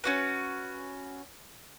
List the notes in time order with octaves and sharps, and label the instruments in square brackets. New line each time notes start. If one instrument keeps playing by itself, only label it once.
[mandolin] C#4 F#4 B4